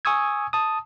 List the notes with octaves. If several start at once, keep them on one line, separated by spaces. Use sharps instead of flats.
G#5 C#6 D#6 E6 G#6
A5 D#6